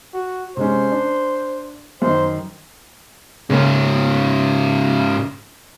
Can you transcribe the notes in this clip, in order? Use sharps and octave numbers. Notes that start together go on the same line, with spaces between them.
F#4
C3 G#3 C#4 C5
D4
F#2 D#3 C5
G#2 C#3 A#3 C#4